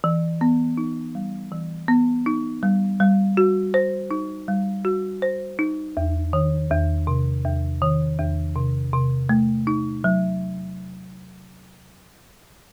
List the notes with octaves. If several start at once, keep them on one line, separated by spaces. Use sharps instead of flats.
E3
B3
D#4
G3
E3
B3
D#4
G3
G3
F#4
C5
D#4
G3
F#4
C5
D#4
E2
D#3
E2
C3
E2
D#3
E2
C3
C3
A3
D#4
F#3